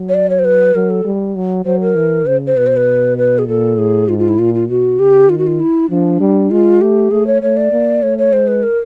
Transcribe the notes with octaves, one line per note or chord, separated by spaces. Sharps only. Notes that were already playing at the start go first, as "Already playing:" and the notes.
Already playing: F#3
C#5
D5
C#5
C5
B4
F#3 A#4
A4
G3
F#3
F#3 C5
A#4
E3
C#3 C5
C5
B2 B4
C5
B4
B4
G#4
A#2 A4
A2 G#4
G#2 F4
F4
E4
A#2 F4
F4
B2 F#4
C#3 G4
D#3 F4
F#4
F4
E4
F3 D4
G3
G#3 F4
A3 G4
A3 G#4
C#5
A3 C#5
D5
A#3
A3 C#5
C#5
G#3 C5
B4
A#4